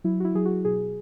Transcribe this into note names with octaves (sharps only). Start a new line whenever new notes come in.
F#3 E4
F#4
E4
F#3 G#4
F#4
B2 G#4